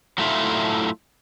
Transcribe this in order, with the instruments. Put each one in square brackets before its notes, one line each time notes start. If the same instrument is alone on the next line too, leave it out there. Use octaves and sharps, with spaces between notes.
[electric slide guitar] F#3 A3 E4 F4